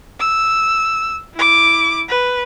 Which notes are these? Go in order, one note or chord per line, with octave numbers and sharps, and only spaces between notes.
E6
E4 D6
B4